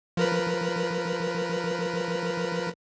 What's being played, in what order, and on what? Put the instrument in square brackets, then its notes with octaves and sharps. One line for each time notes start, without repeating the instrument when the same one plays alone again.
[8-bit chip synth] F3 A#4 B4